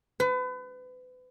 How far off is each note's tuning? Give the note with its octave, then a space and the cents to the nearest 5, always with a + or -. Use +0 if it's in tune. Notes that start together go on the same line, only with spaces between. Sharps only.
B4 +35